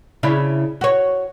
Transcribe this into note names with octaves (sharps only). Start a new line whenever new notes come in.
C#3 D4 E4
F#4 C#5